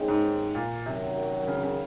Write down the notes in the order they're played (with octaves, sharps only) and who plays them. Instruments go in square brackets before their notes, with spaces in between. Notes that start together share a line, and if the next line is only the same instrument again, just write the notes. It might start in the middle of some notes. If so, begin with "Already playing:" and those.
Already playing: [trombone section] D#2 C#3 G#3 C4 D#4
[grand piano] G#2
A#2
[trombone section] F#2 D#3 F#3 [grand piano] C3
[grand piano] C#3
C#3